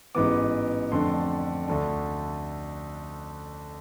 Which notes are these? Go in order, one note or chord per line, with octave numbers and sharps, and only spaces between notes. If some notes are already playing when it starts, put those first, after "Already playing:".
A1 G#2 E3 B3 D6
F2 D3 A3 D4 C6
D2 D3 A3 D4